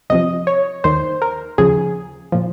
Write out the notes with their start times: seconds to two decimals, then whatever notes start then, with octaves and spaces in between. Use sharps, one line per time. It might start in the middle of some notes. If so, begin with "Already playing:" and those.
0.10 C2 C3 F3 D#5
0.47 C#5
0.84 D#2 D#3 C5
1.22 A#4
1.58 D#2 C#3 F3 G#4
2.32 A#2 F3